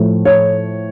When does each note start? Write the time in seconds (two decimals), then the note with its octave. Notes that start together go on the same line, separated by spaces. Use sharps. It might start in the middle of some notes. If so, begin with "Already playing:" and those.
Already playing: A2 F3 A3
0.25 C#5